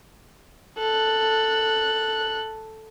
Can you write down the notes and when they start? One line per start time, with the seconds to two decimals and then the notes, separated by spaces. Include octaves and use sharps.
0.78 A4 F#6